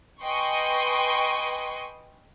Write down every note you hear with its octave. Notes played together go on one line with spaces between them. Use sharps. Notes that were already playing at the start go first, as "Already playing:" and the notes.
B4 D#5 G5 G#5 C6 C#6